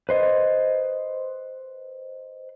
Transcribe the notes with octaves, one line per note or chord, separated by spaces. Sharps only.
B4 C5 D#5